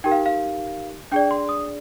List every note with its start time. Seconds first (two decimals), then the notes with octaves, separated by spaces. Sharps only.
0.04 D#4 G4 A#4 G5
0.11 F5
0.26 F5
1.12 D4 G#4 D5 G5
1.31 C6
1.49 D#6